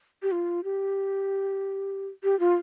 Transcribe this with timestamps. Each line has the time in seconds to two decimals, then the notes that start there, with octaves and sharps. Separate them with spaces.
0.23 G4
0.31 F4
0.64 G4
2.23 G4
2.39 F4